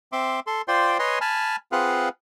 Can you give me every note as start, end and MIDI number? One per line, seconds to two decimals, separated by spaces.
0.12 0.40 60
0.12 0.40 76
0.12 0.40 84
0.12 0.40 86
0.47 0.62 69
0.47 0.62 84
0.68 0.98 65
0.68 0.98 72
0.68 0.98 74
0.68 0.98 79
0.68 0.98 84
0.99 1.19 71
0.99 1.19 73
0.99 1.19 75
0.99 1.19 80
0.99 1.19 84
1.21 1.56 80
1.21 1.56 81
1.21 1.56 83
1.21 1.56 89
1.72 2.09 60
1.72 2.09 65
1.72 2.09 68
1.72 2.09 71
1.72 2.09 77
1.72 2.09 78